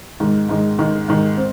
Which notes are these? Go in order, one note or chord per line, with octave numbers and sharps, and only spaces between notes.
G#2 D#3 G#3
G#2 D#3 G#3
G#2 D#3 G#3
G#2 D#3 G#3
C4